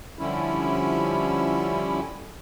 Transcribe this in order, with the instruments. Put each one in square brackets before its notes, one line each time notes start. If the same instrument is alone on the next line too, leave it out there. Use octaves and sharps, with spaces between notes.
[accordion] D3 F3 G3 C#4 E4